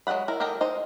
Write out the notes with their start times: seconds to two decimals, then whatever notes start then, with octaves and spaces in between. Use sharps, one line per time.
0.07 F#3 G#3 D#5 F#5 B5
0.28 E4 A#4
0.40 D#3 G4 A4 A#4 D#5
0.61 D#4 C5